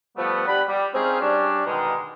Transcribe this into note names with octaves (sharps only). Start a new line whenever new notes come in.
F3 G3 A3 B3
D4 G4 F#5 B5
G3
C4 C#4 D#4 F4 G#4
G3 C#4 D4
B2 D3 D#3 G#3 D#4